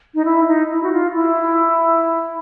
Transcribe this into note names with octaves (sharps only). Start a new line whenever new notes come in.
D#4
E4
D#4
E4
F#4
F4
E4